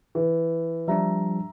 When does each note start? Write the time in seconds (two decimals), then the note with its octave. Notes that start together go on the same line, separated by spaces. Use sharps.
0.15 E3
0.88 F3 G3 D4 E5 A#5